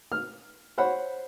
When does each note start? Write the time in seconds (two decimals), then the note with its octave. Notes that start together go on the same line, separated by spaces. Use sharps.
0.12 F6
0.78 C5 C#5 F#5 B5